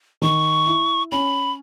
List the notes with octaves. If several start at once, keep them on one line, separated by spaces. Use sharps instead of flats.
D#3 C#6
E4
C#4 B5